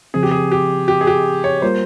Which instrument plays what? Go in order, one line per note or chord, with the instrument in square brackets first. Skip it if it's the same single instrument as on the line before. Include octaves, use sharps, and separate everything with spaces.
[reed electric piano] C#3 F3 C4 [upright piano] G#4
[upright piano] G4
G#4
G4
G4
G#4
G4
C#5
[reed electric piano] G3 A#3 F4 A#4 [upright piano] C5